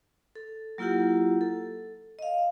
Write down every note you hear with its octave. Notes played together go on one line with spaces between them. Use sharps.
A4
F#3 A#3 E4 F4 G4 F#5
A4
D#5 F5